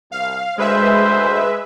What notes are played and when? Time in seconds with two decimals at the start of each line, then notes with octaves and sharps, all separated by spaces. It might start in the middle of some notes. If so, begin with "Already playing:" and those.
0.12 C2 F5
0.58 D2 G#3 B4 C5 E5